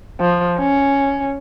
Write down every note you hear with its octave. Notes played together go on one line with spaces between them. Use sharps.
F3
C#4